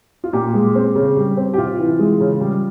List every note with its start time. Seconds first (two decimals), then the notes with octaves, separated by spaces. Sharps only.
0.24 F4
0.33 A#2 G4
0.54 G#3
0.75 C4
0.95 C#3
1.16 G3
1.37 C4
1.54 G4
1.58 C3 F4
1.79 E3
1.99 G#3
2.20 C#3
2.40 G3